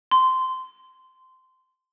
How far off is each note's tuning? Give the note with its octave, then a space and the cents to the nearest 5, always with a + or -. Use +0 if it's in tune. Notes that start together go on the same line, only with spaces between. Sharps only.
C6 -15